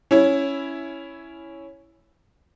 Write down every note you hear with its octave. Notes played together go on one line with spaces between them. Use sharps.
C#4 E4